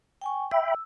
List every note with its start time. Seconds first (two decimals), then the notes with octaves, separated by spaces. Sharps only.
0.21 G5 G#5 C#6
0.51 E5 G5 B5 E6